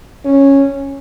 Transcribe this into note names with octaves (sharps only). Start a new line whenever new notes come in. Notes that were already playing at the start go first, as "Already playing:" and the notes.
C#4